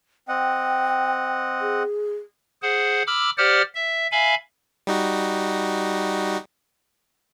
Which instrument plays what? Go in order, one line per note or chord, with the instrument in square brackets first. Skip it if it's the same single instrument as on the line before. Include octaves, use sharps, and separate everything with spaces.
[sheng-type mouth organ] C4 D#5 F#5 [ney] G5
[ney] G#4
[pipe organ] G#4 C5 F#5
B5 D6 E6 F6
G4 C5 D5 F#5 F6
E5
E5 F5 G#5 B5
[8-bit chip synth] G3 D#4 F#4